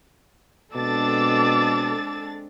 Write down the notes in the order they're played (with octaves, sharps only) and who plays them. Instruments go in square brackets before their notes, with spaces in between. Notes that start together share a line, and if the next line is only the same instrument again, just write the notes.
[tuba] B2 [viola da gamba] G#3 C4 D4 [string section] A4 A6 [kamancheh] D6 E6